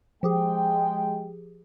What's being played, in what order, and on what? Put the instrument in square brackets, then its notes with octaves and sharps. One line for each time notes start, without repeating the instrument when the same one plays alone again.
[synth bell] F3 G4 G#4 [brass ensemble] G#3 G5